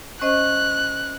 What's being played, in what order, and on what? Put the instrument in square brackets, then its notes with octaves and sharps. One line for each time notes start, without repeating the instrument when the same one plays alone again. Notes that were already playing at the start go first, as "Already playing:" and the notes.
[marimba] C#4 C5 D#5 [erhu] F#6